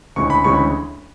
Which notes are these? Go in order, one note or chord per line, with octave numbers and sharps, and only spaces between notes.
D2 C#3 G#3 C#4 E4 C#6
B5
D2 C#3 E3 G#3 C#4 C#6
B5